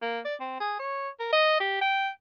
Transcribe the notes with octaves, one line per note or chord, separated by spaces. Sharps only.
A#3
D5
C4
G#4
C#5
A#4
D#5
G4
G5